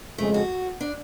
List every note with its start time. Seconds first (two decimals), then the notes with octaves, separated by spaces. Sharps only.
0.18 F2 C#3 G#3 A3
0.34 F#4
0.81 D4